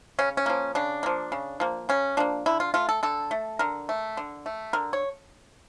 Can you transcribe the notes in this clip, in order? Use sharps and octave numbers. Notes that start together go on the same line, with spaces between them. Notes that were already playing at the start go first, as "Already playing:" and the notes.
C#3 C#4
C#4
F3 A#3
C#3 D4
F3 A#3
C#3
F3 A#3
C#3 C#4
F3 A#3 D4
D3 E4
F4
A3 F4
A4
D3 A4
A3
D3 A#4
A3
D3
A3
D3 A#4
C#5